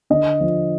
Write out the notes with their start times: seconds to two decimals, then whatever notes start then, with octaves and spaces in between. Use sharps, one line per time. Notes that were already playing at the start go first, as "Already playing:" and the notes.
0.10 D3 D#5
0.41 F3